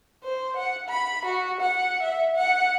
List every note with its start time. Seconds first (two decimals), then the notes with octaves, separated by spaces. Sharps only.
0.24 C5
0.57 F#5
0.89 B5
1.25 F#4
1.61 F#5
2.03 E5
2.36 F#5